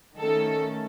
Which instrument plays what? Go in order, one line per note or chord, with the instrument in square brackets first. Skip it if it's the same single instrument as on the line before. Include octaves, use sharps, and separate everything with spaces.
[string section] D#3 A3 C#4 A4